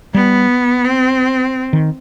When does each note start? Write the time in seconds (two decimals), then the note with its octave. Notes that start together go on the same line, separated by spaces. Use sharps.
0.14 G3 B3
0.85 C4
1.73 D#3